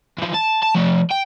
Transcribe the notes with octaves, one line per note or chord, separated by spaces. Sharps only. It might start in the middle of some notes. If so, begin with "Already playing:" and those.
E3 F3
A5
A5
F3 A3
G5